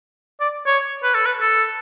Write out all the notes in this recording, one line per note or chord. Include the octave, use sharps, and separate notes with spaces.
D5
C#5
B4
A4
B4
A4